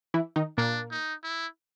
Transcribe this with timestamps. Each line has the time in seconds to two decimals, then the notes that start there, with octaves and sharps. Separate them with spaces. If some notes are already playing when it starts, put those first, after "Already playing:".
0.14 E3 E4
0.36 D#3 D#4
0.58 A#2 A#3 D4
0.91 D#4
1.24 E4